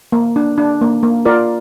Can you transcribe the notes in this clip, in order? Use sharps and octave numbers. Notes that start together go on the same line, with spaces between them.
A#3
D4
D4
A#3
A#3
F4 A#4 D5